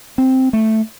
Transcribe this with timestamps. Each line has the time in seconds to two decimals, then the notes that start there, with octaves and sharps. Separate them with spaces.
0.18 C4
0.53 A3